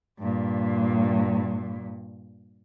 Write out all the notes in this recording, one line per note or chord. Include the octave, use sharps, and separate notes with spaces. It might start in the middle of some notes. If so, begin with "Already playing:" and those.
G2 A#2